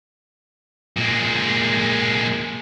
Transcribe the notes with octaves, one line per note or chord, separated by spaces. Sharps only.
A#2 G#3